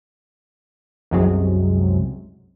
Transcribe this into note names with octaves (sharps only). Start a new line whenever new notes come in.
C2 F#2 C3 F#3 G#3